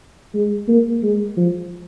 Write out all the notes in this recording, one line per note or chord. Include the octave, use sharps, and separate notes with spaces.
G#3
A#3
G#3
F3